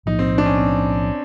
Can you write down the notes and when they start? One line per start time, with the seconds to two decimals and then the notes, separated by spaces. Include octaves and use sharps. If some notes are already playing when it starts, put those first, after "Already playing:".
0.06 B1 A2 F3 A#3 D#4
0.19 C4
0.38 D4
0.46 C#4
0.58 C4